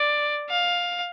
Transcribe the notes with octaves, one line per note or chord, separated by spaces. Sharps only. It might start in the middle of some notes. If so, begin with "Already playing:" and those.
Already playing: D5
F5